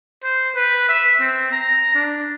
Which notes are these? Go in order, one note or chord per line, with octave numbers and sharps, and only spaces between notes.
C5
B4
E5
C4
A#5
D4